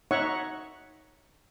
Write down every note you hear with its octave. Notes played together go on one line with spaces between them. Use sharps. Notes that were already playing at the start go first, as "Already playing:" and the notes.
D#4 C#5 E5 F#5 C#6